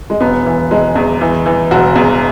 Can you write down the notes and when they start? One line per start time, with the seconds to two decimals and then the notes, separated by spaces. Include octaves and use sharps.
0.10 G#3
0.21 E1 B3
0.46 E3
0.71 E1 G#3
0.95 E2
1.21 E3
1.46 E3
1.71 E1 F#4
1.95 E2